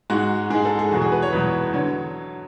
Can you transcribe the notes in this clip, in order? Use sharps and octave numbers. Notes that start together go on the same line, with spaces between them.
G#2 G#3 F#4
G#2 G#3 G#4
A4
G#4
E2 B2 F#3 F#4
G#4
B4
C#5
E2 B2 F#3 B4
D3 F#3 C#5